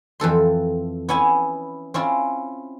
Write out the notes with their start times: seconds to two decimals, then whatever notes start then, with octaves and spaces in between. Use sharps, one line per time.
0.20 F2 E3 A4 C6
1.09 B3 C#4 E4 G#5
1.94 C4 C#4 E4 F4